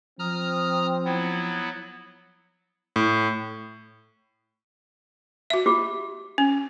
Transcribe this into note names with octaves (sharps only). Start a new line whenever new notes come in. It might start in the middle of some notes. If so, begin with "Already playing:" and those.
F3 C4 A#5 D#6 F6
F#3 B3 E4
A2
F#4 E5
F4 G4 D6
C#4